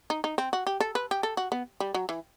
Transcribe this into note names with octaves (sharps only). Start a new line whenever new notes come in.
D#4
D#4
C4
F#4
G4
A4
B4
G4
A4
F#4
B3
G3
F#3
E3